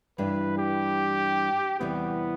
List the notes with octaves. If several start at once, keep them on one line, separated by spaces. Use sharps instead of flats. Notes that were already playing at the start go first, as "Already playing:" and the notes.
G2 E3 G3 D4 B4
G4
E2 C3 E3 G3 B3